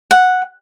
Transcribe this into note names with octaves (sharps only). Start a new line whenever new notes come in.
F#5